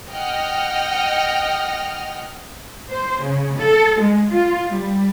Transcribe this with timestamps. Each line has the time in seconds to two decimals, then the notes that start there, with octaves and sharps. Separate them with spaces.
0.12 D#5 F#5 G5 F6
2.91 C5
3.22 C#3
3.58 A4
4.00 G#3
4.32 F4
4.70 G3